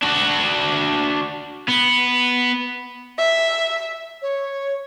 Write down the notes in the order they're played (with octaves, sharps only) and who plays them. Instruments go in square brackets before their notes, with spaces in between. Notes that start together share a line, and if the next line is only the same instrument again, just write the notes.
[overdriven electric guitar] D4 F#4
B3
[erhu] E5
[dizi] C#5